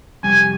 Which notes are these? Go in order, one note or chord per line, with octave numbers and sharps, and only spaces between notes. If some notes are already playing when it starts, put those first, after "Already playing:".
F2 C3 G3 G#5